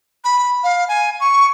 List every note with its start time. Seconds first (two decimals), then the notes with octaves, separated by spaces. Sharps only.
0.24 B5
0.64 F5
0.88 G#5
1.20 C#6